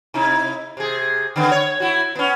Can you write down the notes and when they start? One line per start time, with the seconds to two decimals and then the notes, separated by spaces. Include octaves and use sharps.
0.14 C3 D#4 E4
0.77 C3 G#4
1.36 D3 B3 C#4
1.51 C#5
1.80 E4 F#4
2.15 B3 C#4